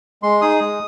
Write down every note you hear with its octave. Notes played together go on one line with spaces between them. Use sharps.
G#3 C6
D#4 G#4 D#6
G#3